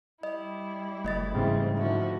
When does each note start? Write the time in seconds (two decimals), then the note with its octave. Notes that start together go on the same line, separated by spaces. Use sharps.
0.23 G3 E4 D#5
1.04 F#1 A3 D#5 A6
1.35 G#2 C#3 E3 G3 C4
1.77 D3 F3 E4 F#4